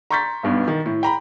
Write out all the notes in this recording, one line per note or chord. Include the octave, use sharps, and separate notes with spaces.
A#5 C6 C#6 G6 A6 B6
B1 G2 B2
D#3
A2
G5 A#5 B5